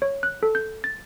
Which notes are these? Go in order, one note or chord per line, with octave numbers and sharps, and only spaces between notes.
C#5
F#6
A4
G6
A6